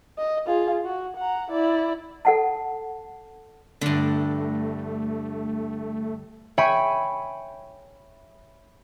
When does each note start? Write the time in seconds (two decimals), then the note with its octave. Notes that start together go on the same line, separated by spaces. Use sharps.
0.18 D#5
0.47 F4 G#4
0.85 F#4
1.16 F#5 A#5
1.50 E4 D5
2.25 A4 F#5 A5
3.81 G2 D3 A3
6.58 C#5 E5 G5 G#5 B5 C#6